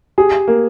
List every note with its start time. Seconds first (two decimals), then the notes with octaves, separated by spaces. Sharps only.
0.18 G4 G#4
0.48 A#3